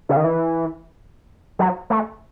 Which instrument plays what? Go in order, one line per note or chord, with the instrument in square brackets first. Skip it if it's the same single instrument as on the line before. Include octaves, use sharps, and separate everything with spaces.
[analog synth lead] C#3
D#3
E3
F#3
A3